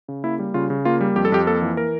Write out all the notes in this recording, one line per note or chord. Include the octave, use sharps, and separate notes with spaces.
C#3
A#3 E4
G3
C#3 F4
C#3
A#3 F4
G3
F2 G4
A4
F2 G4
A#3 A4
E3
A#4